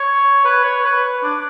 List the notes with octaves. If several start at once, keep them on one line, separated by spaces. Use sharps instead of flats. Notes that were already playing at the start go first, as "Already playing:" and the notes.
Already playing: C#5
B4
C#5
B4
D4